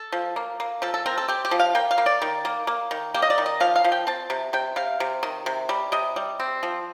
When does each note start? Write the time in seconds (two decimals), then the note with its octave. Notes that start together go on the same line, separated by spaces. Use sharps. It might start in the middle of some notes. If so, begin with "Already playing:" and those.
Already playing: A4
0.12 F3
0.36 A#3
0.60 A#3
0.82 F3 A4
0.94 A4
1.06 C4 A#4
1.18 A4
1.28 C4 G4
1.45 G4
1.51 F3
1.59 F5
1.75 A#3 G5
1.91 F5
1.98 A#3
2.06 D5
2.22 D#3
2.45 A#3
2.67 A#3
2.91 D#3
3.14 A#3 G4
3.22 D#5
3.30 D5
3.38 D#3
3.46 D#5
3.60 F3 F5
3.76 F5
3.84 F3
3.92 G5
4.07 C4 A5
4.30 C3
4.53 C3 G5
4.76 C3 F5
5.00 C3
5.23 D#3
5.46 C3
5.69 G3
5.92 C3 D#5
6.16 G3
6.40 C4
6.63 F3